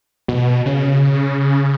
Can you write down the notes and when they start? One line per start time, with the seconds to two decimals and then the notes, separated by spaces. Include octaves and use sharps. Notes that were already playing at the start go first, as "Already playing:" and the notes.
0.28 B2
0.66 C#3